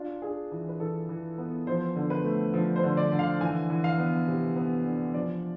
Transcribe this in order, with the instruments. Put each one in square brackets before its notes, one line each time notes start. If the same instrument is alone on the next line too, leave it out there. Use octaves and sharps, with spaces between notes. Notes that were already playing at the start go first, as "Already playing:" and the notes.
Already playing: [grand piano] D4 F4
D4 G#4
E3
B4
E3 A4
E3
B3
F3 C5
D3
B4
A3
F3
C5
D3
D5
D3
F5
E3 G#5
E3
F5
B3
C3
B3
D4
F3 D5